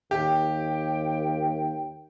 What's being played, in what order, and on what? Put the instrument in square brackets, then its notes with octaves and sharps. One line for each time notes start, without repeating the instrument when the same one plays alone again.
[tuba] D#2 [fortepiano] G4 [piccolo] G5